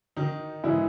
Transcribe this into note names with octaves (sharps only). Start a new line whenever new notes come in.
D#3 D#4
G#2 E3 E4